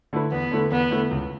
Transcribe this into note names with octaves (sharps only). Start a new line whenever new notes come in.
D3 A3 E4 B4
E2 B3
D3 A3 E4 B4
E2 B3
D3 A3 E4 B4
C#2